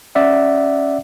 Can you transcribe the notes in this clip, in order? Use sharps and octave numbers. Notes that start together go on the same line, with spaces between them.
C#4 D5 E5 F#5